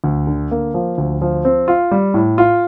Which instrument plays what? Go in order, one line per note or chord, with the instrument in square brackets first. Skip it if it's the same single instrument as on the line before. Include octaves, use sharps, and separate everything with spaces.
[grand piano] D2
D3
A#3
F3
D2
F3
C4
F4
G3
A2
F4